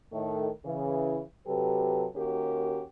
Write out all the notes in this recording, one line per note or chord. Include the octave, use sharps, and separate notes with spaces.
A2 D#3 A3
C#3 E3
C3 F#3 G4 A4 B4
D#2 C#4 F#4 G4 A#4